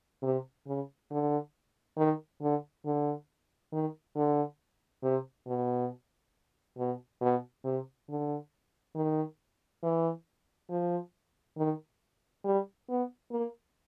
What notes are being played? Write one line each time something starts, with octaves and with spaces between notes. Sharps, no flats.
C3
C#3
D3
D#3
D3
D3
D#3
D3
C3
B2
B2
B2
C3
D3
D#3
E3
F3
D#3
G3
B3
A#3